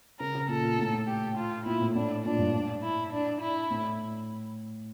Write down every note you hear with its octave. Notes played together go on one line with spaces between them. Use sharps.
C#3 A#4
C#3
A#2 A4
A#2
A2
A2
G4
F4
A#2 E4
A2
A2 D4
A#2 D4
G2
E4
D4
E4
A2